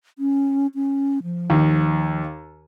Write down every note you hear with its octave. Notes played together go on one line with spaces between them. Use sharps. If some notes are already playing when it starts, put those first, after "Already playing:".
C#4
C#4
F3
D#2